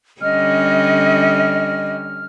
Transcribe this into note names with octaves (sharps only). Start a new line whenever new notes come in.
D3 G3 C#4 D#5 F6